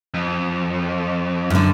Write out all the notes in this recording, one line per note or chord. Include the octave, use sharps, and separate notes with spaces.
F2
F#2 D3